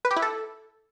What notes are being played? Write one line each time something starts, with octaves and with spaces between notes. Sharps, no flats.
B4
G4
E4
A4